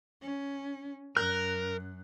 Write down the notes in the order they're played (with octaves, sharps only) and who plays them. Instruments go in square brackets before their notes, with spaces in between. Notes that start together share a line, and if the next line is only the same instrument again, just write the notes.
[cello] C#4
[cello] F#2 [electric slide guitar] A#4 [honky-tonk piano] F#6